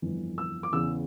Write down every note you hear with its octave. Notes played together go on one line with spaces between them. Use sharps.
G1 F2 E3
E6
D6
E2 C#3 E3 E6